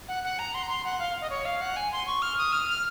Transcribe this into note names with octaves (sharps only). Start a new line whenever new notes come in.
F#5
F#5
A#5
C6
A#5
C6
F#5
F5
D#5
C#5
F5
F#5
G#5
C6
C#6
F6
D#6
F6
F6